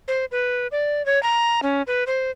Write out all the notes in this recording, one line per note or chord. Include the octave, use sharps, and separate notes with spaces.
C5
B4
D5
C#5
A#5
C#4
B4
C5